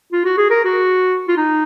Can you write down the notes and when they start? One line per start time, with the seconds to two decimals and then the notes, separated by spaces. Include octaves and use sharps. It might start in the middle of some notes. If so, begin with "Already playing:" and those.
0.12 F4
0.25 F#4
0.37 G#4
0.50 A#4
0.65 F#4
1.28 F4
1.37 D#4